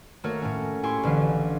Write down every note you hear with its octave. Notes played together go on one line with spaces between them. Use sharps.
D#3 A3 A#3 F#4 A#4 C#5
A2 C#4
E4 G4 G#5 C6 C#6
A1 D3 F#3 F5